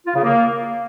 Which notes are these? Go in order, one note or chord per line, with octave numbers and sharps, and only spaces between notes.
F4
C#3
A#3